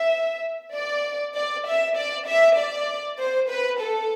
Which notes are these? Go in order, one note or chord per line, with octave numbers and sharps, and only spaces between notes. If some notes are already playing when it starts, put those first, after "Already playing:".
Already playing: E5
D5
D5
E5
D5
E5
D5
C5
B4
A4